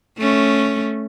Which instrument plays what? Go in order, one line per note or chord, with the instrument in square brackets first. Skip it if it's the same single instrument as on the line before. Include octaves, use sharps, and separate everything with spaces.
[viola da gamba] A3 C#4